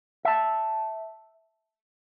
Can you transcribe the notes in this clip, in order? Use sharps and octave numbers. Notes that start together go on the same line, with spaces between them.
E5 A5